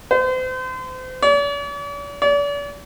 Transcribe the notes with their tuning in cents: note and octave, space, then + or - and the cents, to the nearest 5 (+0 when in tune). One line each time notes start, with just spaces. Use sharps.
C5 -35
D5 -45
D5 -40